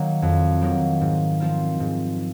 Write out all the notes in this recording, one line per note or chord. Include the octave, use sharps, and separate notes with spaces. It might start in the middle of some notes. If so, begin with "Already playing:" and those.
Already playing: D#3 F#3 A#3
F2
D#3 F#3 A#3
G#2
F3 C4 F4 A#4
G#2